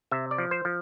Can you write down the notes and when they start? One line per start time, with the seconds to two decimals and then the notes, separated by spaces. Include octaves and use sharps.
0.11 C3 E5
0.31 D5
0.38 F3
0.51 C5
0.65 F3